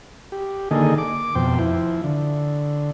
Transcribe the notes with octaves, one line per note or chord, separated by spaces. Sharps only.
G4
D3 D#3 A#3 G#4 A4 D#5
D6
F2 B2 C5 G5
F3 E4
D3